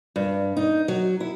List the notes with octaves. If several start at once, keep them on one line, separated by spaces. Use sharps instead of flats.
G2
D#4
F#3
E4